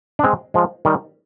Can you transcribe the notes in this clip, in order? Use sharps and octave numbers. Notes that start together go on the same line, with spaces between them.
D4
G#3 C4
F3 G#3
D#3 G3